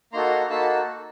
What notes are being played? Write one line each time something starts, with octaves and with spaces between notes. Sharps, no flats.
A#3 D#4 F#4 A4 A#5 C6
A#3 D#4 F#4 A4 A5 B5